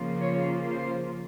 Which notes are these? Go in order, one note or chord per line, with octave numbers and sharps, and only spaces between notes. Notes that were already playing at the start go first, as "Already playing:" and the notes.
Already playing: C#3 F3 A#3 F4
C#5
C5